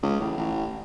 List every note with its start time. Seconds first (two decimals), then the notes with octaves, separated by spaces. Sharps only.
0.02 C#2
0.19 A1
0.37 A1